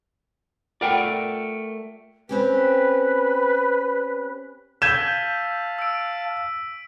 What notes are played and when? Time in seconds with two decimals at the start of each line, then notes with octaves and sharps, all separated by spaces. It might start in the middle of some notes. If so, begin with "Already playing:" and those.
0.81 A3 F4 A#4 D5 F#5 G5
2.29 C4 C#4 G4 B4
4.82 F5 A5 E6 G6 G#6 B6 D#7 E7
5.79 E6 D7